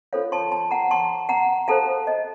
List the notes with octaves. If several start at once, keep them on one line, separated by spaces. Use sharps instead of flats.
C#4 F4 A4 C5 C#5 F5
A5 C6
A5 C6
F#5 A#5
A5 C6
F#5 A#5
F#4 A4 C5 F5 A5
D#5